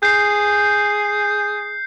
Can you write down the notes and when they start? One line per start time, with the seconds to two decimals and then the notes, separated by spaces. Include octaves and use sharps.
0.03 G#4 G6 C7